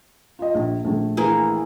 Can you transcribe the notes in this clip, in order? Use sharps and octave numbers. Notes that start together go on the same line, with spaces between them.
F4 D#5
A#1
A#1 A3
E3 A#3 G#4